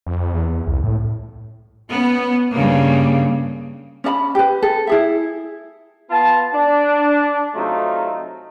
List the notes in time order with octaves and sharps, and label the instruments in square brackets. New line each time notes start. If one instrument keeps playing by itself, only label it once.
[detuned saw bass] F2
E2
C2
A2
[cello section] B3 C#4
G2 C#3 A#3
[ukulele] C#4 D4 D#5 B5
G4 B4
A4
E4 G#4 E5
[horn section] B3 F4 A5
D4
C3 F#3 A3 D#4 F4